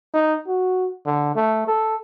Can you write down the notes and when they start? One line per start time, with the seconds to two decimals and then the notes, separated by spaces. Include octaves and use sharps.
0.14 D#4
0.47 F#4
1.05 D3
1.35 A3
1.68 A4